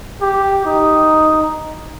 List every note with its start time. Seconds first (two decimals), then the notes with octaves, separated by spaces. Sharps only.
0.22 G4
0.65 D#4